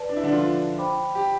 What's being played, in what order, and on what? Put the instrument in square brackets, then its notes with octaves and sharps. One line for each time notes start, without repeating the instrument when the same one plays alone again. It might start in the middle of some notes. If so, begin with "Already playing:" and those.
Already playing: [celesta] B4 D5 A5
[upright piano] D4
E4
D3 D4
F3 F4
[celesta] C5 G5 B5 D6
[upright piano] G4